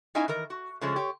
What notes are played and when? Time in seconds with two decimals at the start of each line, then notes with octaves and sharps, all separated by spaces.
0.15 C#4 D#4 E4 E5 F5 G#5
0.28 D#3 E3 A#4
0.50 F#4
0.81 C#3 F3 G#3 A3 C#4
0.96 G4 C#5